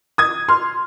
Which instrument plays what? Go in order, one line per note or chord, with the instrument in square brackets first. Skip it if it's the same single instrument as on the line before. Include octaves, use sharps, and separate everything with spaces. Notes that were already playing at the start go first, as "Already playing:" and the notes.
[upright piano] D#6 G#6
C6 F6